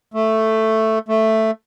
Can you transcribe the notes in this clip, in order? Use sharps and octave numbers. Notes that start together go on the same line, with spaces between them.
A3
A3